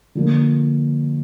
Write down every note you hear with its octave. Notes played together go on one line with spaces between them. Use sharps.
D3 F3 A#3